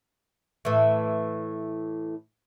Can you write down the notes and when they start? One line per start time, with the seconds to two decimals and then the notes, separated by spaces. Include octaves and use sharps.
0.65 A2 E3